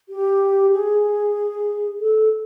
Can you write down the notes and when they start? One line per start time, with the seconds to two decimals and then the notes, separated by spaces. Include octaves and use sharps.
0.09 G4
0.72 G#4
1.99 A4